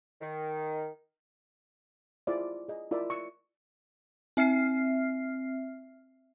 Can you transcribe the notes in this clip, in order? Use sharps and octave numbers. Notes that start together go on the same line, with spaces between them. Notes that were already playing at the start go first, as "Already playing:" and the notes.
D#3
E4 F4 G#4 C5 D5 E5
G#4 D#5
E4 F4 A#4 D5 E5
C#6 E6
C4 E5 F6 C7